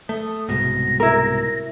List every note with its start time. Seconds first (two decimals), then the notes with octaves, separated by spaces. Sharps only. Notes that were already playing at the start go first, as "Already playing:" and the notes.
0.09 A3 D#6
0.49 C2 G#2 B2 A#6
1.00 E4 A#4